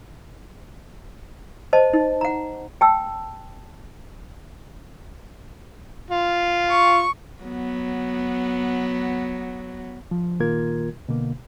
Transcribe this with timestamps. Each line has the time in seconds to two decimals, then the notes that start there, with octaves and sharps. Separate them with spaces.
1.73 C5 D#5 A5
1.93 D#4
2.21 F#5 A#5
2.81 G5 A5 E6
6.11 F4
6.71 C#6
7.43 F#3 B3
10.11 F3
10.40 A#2 D#3 A#3 F4 A#4 G#6
11.09 B2 D3 A#3